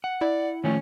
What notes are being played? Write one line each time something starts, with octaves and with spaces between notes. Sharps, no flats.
F#5
E4 D5
D#3 F3 A3 C#4